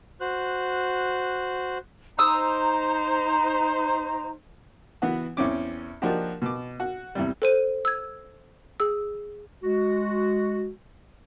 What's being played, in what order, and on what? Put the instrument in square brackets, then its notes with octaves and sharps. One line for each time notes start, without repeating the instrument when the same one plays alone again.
[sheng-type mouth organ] F#4 C5 F#6
[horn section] D#4 C5 [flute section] A#5 [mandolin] D#6 E6
[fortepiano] E3 B3 F#4
E2 C4 C#4 D6
F3 A#3 D4 D#4 F#4 G4
B2 D6
F#4
E2 C3 G3
[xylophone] A4 C5 D#7
E6 G#6
G#4 E6
[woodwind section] G#3 F#4